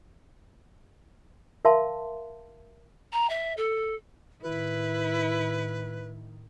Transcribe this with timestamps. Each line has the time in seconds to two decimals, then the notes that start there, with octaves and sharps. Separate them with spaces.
1.65 A#4 E5 F5 A5 C6
3.13 A#5
3.30 E5
3.57 A4
4.43 A2 D#3 E4 B4